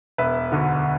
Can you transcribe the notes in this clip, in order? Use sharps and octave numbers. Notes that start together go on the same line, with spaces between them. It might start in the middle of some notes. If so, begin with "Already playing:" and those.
E1 B4 E5
D2 D3